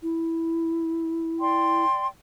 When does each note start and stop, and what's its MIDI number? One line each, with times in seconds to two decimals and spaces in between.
0.03 1.84 64
1.40 2.07 74
1.40 2.07 79
1.40 2.07 84